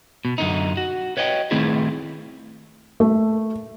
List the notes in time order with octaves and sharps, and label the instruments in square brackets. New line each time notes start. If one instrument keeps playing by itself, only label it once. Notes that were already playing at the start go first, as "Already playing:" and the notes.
[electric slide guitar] B2
F#2 D3 D#4
F#4
B4 C#5 D#5 F5 G5
D#3 A3 C4 E4 G#4 B4
[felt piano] A3